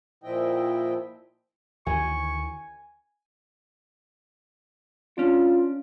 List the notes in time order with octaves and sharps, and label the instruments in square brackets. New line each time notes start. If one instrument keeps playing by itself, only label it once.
[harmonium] A#2 F3 E4 D#5 G5
[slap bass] D2 D#3 E3 [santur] G#5 [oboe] C#6
[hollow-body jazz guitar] C#4 D4 [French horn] F4